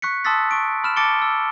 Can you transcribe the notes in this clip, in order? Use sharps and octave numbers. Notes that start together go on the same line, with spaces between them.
C#6 F#6 B6 C#7
A5 C6 D#6 E6 A6 B6
C#6 D7
B5 F6 E7
A5 D6 A6 C#7 D7 G7
E6